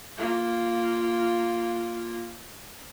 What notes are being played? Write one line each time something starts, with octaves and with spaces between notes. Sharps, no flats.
A#3 F4